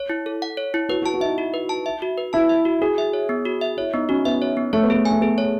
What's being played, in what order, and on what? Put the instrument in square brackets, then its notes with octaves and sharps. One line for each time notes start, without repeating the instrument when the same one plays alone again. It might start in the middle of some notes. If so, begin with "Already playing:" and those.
Already playing: [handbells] C#5
E4
A4
F#5
C#5
E4
[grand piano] F#4 [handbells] B4
[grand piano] F#4
[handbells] A5
[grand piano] F#4
[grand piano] D#4 E4 [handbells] E5
[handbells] F#4
B4
A5
E5
F#4
B4
[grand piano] E4 [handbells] A5
[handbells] E5
F#4
[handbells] F#4 [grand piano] G#4
[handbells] E5
C#5
B3
F#4
E5
[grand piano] E4 [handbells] C#5
[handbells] B3 [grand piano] D#4
[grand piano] C#4 [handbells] F#4
[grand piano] B3 [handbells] E5
[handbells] C#5
B3
[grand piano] A3 [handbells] C#5
[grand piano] B3
[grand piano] A3 [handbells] G#4
[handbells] G#5
[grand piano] A3
[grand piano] B3 [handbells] G#4
[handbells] C#5